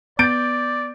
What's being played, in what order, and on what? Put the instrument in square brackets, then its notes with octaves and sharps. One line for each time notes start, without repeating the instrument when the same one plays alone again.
[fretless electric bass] B3 [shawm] D5 [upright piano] G6 A6 D7